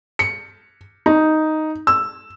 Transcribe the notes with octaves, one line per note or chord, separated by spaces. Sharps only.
C#7
D#4
E6